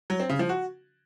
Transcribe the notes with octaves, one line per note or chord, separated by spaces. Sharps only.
F#3
C4
C#3
F3
F#4